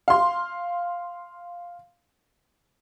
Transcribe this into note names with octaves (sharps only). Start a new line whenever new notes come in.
F5 C6